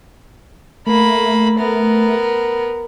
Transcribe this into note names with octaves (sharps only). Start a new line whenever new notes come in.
A3 A#3 B5
B3 A#4